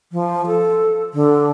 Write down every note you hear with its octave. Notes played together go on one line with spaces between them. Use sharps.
F3
A4
D3